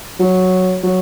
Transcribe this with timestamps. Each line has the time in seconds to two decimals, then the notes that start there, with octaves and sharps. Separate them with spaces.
0.19 F#3
0.83 F#3